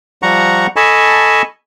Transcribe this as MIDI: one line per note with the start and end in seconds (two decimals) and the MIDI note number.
0.23 0.67 53
0.23 0.67 55
0.23 0.67 78
0.23 0.67 82
0.23 0.67 85
0.76 1.42 69
0.76 1.42 75
0.76 1.42 80
0.76 1.42 81
0.76 1.42 83
0.76 1.42 85